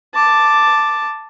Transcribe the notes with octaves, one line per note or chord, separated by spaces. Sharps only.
A5 D6